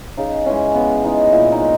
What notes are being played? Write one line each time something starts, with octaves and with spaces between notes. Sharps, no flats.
C#3 D#4
E3 G#3 C#4
C#3 B3
E3 G#3 D#4
A#2 E4
D#4
G#3